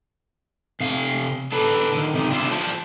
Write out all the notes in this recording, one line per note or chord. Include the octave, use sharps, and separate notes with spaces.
C3 F5
D4 A4 B4
D3 D#3
C3 D#4
D4 F4 G4 C5 E5
F4 C5 D5 A5